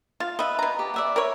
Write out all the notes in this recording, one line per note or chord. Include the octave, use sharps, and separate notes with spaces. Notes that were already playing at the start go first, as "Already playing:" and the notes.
F4 F5
B4 D#5 E5
B2 A#5
G4
D5 E5 F#5
A#4 B4 C#5